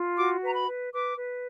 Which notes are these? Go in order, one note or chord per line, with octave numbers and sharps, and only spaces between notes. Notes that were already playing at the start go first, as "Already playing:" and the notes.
Already playing: F4
F#4 D6
B4 A#5
B5
B4
B4 D6
B4